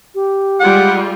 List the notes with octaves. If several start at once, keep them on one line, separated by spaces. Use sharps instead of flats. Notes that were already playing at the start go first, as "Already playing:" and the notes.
G4
G3 G#3 F4 F#5